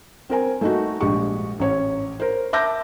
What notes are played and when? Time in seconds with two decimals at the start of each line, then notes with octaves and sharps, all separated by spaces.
0.30 C4 A#4 G#5
0.61 A3 D#4 F#4
1.01 A#1 G#3 G4 C#6
1.59 A1 C#5
2.20 A#4 C5
2.53 E5 A5 D6 E6 G6 A#6